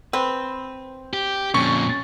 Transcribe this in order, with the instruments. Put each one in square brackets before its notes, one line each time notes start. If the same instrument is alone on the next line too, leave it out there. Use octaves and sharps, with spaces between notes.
[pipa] C4 [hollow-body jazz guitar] B4
[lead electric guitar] G4
[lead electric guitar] F2 A#2 [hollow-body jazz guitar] C#4 [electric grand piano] C#6